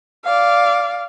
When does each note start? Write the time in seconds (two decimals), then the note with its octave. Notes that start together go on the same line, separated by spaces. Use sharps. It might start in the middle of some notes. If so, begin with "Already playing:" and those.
0.25 D5 F5